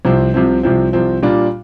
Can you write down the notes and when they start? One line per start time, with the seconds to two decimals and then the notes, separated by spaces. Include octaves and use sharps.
0.05 C2 C3 F3 C4
0.34 C2 C3 F3 C4
0.63 C2 C3 F3 C4
0.93 C2 C3 F3 C4
1.22 A#2 G3 D4 F4